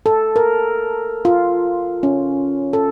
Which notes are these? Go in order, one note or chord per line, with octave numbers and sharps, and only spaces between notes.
A4
A#4
F4
C#4
A4